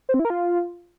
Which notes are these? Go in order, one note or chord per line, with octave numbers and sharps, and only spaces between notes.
C5
C4
E4
A#4
F4